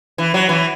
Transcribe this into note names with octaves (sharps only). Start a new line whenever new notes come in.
E3
F#3
E3